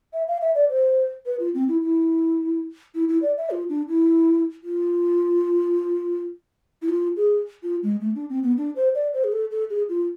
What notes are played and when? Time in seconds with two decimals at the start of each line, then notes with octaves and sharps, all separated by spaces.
0.13 E5
0.28 F5
0.41 E5
0.55 D5
0.69 C5
1.26 B4
1.40 F4
1.54 C4
1.69 E4
1.82 E4
2.95 E4
3.08 E4
3.22 D5
3.37 E5
3.51 F4
3.69 D4
3.88 E4
4.63 F4
6.82 E4
6.89 F4
7.17 G#4
7.63 F4
7.83 G#3
8.01 A3
8.15 D4
8.29 C4
8.43 B3
8.57 D4
8.76 C5
8.95 D5
9.13 C5
9.24 G#4
9.32 A4
9.51 A4
9.70 G#4
9.89 F4